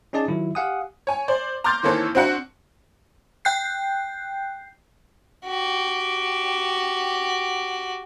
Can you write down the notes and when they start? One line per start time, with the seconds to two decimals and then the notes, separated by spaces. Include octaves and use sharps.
0.13 C#4 D#4 G#4 D5 A5
0.28 D#3 F#3 E4 F4
0.55 G4 F5 F#5 G#5 D#6
1.07 C#5 G#5
1.28 C5 D5
1.64 A#5 C6 D6 F6 G6 A6
1.83 D#3 E3 A#3 C4 A4 C#5
2.15 C4 D4 F#4 F#5
3.45 G5 F#6 G6 C7
5.46 F#4 G4